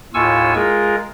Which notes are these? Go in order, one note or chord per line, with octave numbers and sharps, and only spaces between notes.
D#2 A2 F4 G#5 C#6 E6
G#3 F4 G#4 A#4